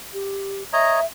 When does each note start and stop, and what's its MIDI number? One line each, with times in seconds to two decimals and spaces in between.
0.13 0.63 67
0.73 1.00 73
0.73 1.00 75
0.73 1.05 76
0.73 1.00 82